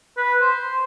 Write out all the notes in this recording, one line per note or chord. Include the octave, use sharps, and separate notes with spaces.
B4
C5